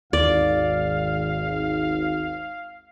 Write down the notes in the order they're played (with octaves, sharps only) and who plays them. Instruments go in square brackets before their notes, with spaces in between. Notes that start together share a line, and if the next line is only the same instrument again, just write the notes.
[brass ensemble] G#1 [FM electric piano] D#2 [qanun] D5 [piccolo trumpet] F5